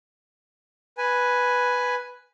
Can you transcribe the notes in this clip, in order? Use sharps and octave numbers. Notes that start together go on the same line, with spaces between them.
B4 G#5